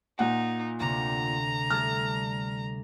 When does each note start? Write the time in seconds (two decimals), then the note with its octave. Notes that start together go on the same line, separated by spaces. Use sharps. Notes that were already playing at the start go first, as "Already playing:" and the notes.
0.19 A#2 D#4 F#5
0.80 D2 C3 A#5 C#7
1.70 G3 A3 A4 F6